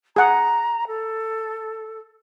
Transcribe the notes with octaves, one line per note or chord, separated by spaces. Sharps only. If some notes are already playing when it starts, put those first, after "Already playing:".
G#4 F#5 A#5
A4